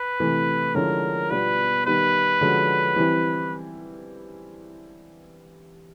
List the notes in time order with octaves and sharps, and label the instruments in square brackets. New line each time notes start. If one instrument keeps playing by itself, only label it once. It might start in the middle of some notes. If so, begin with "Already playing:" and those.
Already playing: [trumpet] B4
[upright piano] C3 E3 A3
[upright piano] D3 F3 G#3 C#4 E4 [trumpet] A#4
[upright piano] B2 G3 B3 D4 F4 [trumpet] B4
[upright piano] D#3 G3 B3 D#4 [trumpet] B4
[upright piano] D3 F3 G#3 C#4 F#4
E3 G3 C4 E4